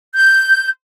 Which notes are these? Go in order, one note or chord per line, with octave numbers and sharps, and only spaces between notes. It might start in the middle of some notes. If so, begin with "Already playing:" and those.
G6